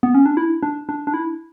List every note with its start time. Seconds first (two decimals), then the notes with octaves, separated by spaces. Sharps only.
0.03 B3
0.14 C#4
0.26 D4
0.37 E4
0.63 D4
0.89 D4
1.07 D4
1.14 E4